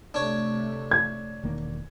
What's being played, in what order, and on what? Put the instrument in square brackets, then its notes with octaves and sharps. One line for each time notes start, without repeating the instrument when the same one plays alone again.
[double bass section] C3 A3 [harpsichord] D4 C#5
[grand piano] G#6
[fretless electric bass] E1 D#3 A#3